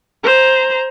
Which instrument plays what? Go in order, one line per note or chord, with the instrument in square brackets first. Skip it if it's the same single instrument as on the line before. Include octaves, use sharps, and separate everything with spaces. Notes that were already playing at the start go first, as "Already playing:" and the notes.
[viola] C5 A#5